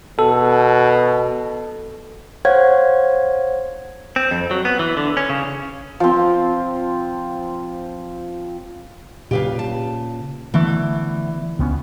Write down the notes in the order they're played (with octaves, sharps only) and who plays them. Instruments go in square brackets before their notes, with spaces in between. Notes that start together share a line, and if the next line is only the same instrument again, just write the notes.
[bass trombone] B2 [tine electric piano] A4
[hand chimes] C5 C#5 F5 F#5 G#6
[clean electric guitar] C4
F2
F#3
B3
E3
D3
C#4
C#3
[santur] F3 C4
[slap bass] A#2 C#3 [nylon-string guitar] G4 B4 F5
[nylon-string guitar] A5
[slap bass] D3 A3 B3 [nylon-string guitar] E3
[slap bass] C#2 B3 C#4